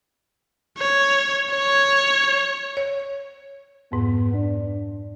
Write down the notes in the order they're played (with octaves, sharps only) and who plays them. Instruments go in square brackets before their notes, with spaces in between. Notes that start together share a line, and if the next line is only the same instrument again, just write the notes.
[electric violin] C#5
C#5
[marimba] C#5
[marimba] F2 G#2 [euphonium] B3
[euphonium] D4